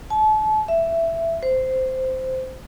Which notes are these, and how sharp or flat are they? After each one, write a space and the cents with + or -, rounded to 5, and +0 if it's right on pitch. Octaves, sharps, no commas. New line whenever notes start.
A5 -35
E5 +10
C5 -10